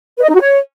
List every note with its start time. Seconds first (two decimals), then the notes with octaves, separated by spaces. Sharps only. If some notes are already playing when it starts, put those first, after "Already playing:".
0.18 B4
0.24 D#5
0.29 D#4
0.35 F#4
0.41 C#5